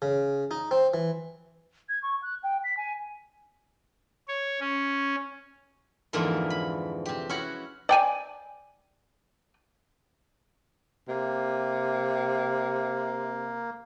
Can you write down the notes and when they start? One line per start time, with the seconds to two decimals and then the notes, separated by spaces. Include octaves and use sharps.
0.02 C#3
0.51 D#4
0.71 C4
0.94 E3
1.89 G#6
2.03 C#6
2.22 F#6
2.43 G5
2.64 B6
2.77 G#5
4.28 C#5
4.60 C#4
6.13 F2 G#2 D3 E3 A#3
6.50 B5
7.05 C3 G4
7.29 C#4 E4 F#4 F#5
7.89 D5 G5 G#5
11.08 C3 A#3